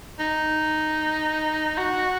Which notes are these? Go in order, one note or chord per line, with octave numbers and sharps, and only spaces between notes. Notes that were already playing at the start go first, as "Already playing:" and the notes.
D#4
F#4